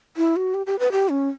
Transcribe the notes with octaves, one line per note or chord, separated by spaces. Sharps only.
E4
F#4
G4
G4
B4
G4
C#4